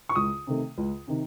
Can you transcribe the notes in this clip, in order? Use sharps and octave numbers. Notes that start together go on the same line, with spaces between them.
C#6
C#2 D#6
C3 D#3 A3
C#2
C3 D#3